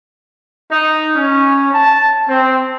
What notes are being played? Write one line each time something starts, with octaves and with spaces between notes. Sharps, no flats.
D#4
C#4
A5
C4